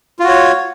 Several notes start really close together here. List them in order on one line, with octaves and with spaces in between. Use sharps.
F4 F#4 C#5